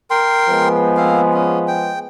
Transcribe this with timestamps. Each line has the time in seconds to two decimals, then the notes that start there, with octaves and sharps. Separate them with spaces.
0.10 A#4 G5 C6
0.48 F3 G#3 B3
0.97 A#3 C4 F5
1.33 C#4
1.68 G5